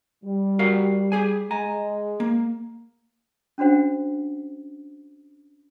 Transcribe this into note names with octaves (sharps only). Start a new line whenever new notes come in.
G3
F#4 A#4 F5
G4 G#4 G#5
G#3 G#5 A#5
A#3
C#4 D4 F#4 C5 F#5